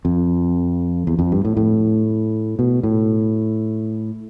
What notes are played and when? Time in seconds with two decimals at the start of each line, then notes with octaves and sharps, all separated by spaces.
0.05 F2
1.07 E2
1.19 F2
1.32 G2
1.45 A2
1.57 A2
2.59 B2
2.83 A2